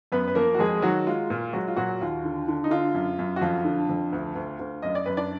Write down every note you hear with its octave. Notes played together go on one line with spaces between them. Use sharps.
F#2 B3 B4
B4
F3 A#3 A#4
F#4
F2 G#3 G#4
D#3 F#3 F#4
G#3 F4
A#2 F4
F#3 G#3 F#4
F4
A#2 F#3 F#4
D#2 F4
D3
D3
D#4
D3 F4
F#2
F#2
F#4
F2 F4
D3
F2
D2
D2
D2
F#2 D#5
D5
F#2 B4
D4 D5